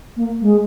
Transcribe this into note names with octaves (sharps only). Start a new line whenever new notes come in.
A#3
G#3